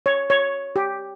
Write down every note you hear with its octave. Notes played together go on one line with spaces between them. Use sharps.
C#5
C#5
G4